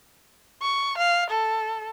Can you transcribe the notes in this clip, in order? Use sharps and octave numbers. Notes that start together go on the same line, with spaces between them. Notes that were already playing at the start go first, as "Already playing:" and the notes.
C#6
F5
A4